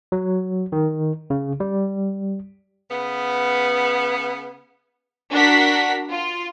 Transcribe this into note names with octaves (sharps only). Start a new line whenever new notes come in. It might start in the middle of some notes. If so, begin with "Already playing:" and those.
F#3
D#3
C#3
G3
C#3 B3
D4 F#4 A#4 F#5 B6
F4